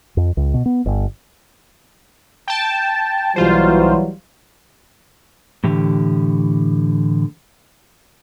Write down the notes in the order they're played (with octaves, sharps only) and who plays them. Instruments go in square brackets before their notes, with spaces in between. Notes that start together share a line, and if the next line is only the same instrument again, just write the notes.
[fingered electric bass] F2
C#2
B2
B3
G1
[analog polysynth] G5 A5
[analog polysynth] B1 F4 C5 [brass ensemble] E3 F#3 G3
[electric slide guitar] A2 D3 E3 G4